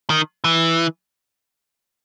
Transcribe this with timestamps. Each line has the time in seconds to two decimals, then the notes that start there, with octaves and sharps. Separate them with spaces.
0.10 D#3
0.44 E3